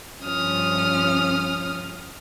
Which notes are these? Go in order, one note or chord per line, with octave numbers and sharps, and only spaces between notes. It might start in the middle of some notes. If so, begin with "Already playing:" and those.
G2 F3 C#4 F4 D#6 F6